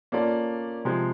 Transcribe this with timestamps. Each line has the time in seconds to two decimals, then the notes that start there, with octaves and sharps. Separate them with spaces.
0.12 A#3 C#4 F4 A4 D5
0.85 C3 F3 G#3